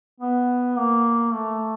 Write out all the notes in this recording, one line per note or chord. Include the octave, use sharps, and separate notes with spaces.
B3
A#3
A3